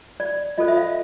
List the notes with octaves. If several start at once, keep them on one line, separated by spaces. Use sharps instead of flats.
D5
F4 A4 C5 D#5
E5
F5